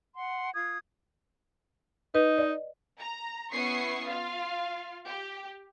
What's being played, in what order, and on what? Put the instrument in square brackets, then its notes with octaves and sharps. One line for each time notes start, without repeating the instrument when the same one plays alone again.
[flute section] F#5 C6
F4 D#6 G#6
[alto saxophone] D#4 [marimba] B4
[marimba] D5 D#5
[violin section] A#5
B3 C#4 E4 C#6 D#6 C7
F4 F5
G4